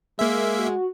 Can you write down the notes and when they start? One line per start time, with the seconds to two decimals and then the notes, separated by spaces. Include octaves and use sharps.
0.19 G#3 A#3 E5
0.58 F#4